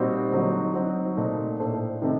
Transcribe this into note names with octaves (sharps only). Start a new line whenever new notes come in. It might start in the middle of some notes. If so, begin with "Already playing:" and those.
Already playing: A#2 G3 C4 D#4 F#4
D3 F#3 C4 D#4 F#4
F#3 C4 D#4 F#4
A#2 A3 D#4
A2 A3 D4 A4 C5
C3 D#3 A3 C4 D#4